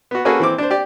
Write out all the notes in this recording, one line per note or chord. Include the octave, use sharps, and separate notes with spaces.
B3 F#4
A#3 C#4 F#4 G#4 A4 B4
E3 C4 D6
D4 C5
G4 D5